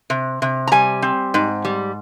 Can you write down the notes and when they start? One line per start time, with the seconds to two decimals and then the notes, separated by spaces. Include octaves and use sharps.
0.10 C3
0.42 C3
0.67 A#5
0.72 G3 G#5
1.02 C4
1.34 G#2
1.65 G3